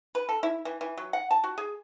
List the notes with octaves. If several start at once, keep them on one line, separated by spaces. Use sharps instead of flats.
B4
A4
E4
E3
E3
F#3
F#5
A5
F#4
G#4